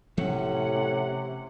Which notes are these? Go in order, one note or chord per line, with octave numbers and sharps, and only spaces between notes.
A2 C3 F3 A3 C4 C#4 F#5